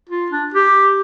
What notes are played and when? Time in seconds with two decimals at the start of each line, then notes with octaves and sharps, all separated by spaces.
0.09 F4
0.30 D4
0.54 G4